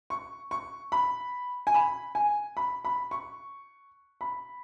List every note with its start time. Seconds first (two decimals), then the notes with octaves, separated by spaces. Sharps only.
0.10 C#6
0.51 C#6
0.92 B5
1.67 G#5
1.74 B5
2.15 G#5
2.57 B5
2.85 B5
3.11 C#6
4.21 B5